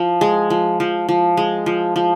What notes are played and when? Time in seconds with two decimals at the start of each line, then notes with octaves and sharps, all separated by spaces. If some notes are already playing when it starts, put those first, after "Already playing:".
Already playing: F3
0.21 G#3
0.50 F3
0.80 F3
1.09 F3
1.37 G#3
1.66 F3
1.96 F3